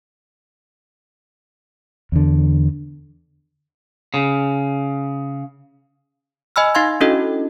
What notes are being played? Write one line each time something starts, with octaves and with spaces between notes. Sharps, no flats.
E2 D3
C#3
D#5 G#5 B5 E6 F6
D#4 F5 C6 G#6
C#4 D4 E4 F#4 A4 D#5